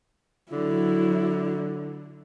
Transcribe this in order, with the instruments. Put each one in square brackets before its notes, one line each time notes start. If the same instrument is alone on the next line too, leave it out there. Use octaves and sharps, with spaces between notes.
[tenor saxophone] D3 [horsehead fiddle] F#3 E4